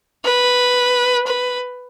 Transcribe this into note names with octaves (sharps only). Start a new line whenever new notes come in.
B4
B4